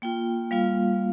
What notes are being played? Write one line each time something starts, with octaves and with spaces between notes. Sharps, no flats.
A#3 F4 G5
G3 A#3 F4 F5